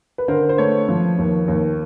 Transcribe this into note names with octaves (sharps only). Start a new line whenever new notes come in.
B4
D3 A#4 C5
C5
A3 B4 C#5
F3
D#2
D#2